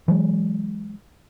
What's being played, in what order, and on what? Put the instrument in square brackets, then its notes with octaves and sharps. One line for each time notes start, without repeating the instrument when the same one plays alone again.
[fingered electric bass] E3 F#3 G#3